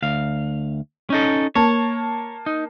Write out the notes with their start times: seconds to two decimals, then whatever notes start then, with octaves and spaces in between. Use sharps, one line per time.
0.02 D2 F5
1.10 C#4 D#4 A4
1.55 A#3 C#5 A5
2.46 D#4